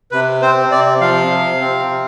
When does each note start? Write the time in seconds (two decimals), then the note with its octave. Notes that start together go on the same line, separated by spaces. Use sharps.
0.11 C3 B4
0.42 C4 C5
0.71 C3 D5
1.01 F3 F5
1.31 C3
1.61 C4
1.90 C3